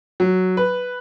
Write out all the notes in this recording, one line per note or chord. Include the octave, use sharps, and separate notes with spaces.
F#3
B4